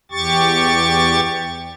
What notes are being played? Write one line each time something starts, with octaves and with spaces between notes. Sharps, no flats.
E2 G4 C#6 A6